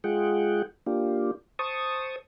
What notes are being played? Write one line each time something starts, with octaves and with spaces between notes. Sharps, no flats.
G#3 F4 G#4 F#5 G5
A#3 D4 F4 G4
C5 A5 C#6 D#6